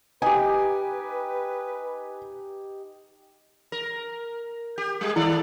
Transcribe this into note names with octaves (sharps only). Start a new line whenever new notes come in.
D#4 G4 B4 G#5
A#4
G4
G3 G#3 G#4
D#3 E4 A4 D5